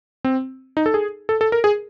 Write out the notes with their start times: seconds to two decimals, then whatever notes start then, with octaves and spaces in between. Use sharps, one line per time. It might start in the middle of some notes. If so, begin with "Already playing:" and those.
0.24 C4
0.77 D#4
0.86 A4
0.94 G#4
1.29 A4
1.41 A4
1.52 A#4
1.64 G#4